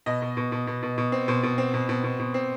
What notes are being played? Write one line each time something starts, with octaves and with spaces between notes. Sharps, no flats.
B2 D#5
B2
B2
B2
B2
B2
B2
C4
B2 C5
B2
C4
B2
B2
B2
B2
C4